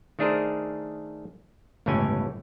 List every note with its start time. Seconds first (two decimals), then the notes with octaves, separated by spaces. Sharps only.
0.19 D#3 A3 D4 G#4 A#4 C5
1.86 G1 C#2 A2 E3 C#4 G#5